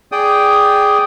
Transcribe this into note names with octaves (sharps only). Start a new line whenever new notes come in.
G#4 D5 G5 D#6